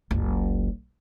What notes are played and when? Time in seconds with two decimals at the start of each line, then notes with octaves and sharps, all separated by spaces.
0.11 F#1 C#2